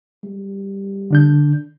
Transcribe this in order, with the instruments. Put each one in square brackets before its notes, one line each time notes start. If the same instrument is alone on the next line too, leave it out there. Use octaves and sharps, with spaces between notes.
[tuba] G3
[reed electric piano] D3 D4 G6